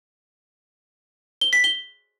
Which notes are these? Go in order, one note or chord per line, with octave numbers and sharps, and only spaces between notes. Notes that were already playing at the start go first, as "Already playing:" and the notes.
G7
B6
G7